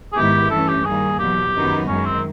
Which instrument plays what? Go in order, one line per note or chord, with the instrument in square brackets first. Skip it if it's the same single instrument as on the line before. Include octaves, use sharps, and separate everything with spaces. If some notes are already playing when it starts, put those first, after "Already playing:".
[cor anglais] G#4
[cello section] G#2 D#3 G#3 B3 E4 [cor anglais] G4
[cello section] G2 E3 A3 C#4 [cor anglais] A4
[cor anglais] G4
[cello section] D#3 G3 A#3 [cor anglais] G#4
[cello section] E2 B2 F#3 [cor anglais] G4
[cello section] F#2 D#3 F#3 B3 D#4
[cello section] F#2 D#3 G#3 [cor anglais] C#4
[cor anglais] C4